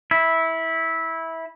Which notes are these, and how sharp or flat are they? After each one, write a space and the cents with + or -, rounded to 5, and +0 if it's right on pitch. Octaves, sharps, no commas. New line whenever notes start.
E4 -15